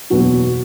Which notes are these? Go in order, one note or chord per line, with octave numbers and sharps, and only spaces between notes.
F#1 E2 B2 F#3 F#4